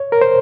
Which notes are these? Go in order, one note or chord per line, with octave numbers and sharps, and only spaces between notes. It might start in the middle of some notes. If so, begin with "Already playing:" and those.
Already playing: C#5
A#4
C5